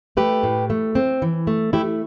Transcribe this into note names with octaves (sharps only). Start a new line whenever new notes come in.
A3 G4 B4
A2
A3
C4
E3
A3
A3 E4 G4